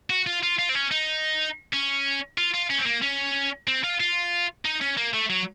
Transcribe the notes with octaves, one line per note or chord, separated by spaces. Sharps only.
F#4
F4
F4
F4
C4
C#4
D#4
C#4
F4
F4
C#4
C4
A#3
C#4
C4
F4
F4
D#4
C#4
A#3
A3
F#3